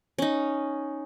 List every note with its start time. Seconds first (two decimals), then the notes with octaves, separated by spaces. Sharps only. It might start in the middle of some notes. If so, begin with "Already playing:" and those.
0.18 C#4 D#4